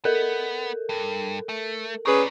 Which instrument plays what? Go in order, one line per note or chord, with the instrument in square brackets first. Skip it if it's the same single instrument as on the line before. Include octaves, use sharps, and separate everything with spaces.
[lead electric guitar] B3 [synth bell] A4 A#4
[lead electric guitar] G2
A3
[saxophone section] C#4 G#4 B4 [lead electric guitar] A#4 D5 [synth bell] C#6